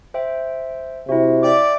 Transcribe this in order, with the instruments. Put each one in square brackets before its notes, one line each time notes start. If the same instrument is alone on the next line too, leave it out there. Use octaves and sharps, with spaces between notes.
[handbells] C5 E5 G5
[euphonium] C3 [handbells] E4 F#4
[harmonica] D5 [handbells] E5 G5 D6